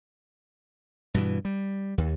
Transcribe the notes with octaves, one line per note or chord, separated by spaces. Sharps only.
G2 B2 E3
G3
D#2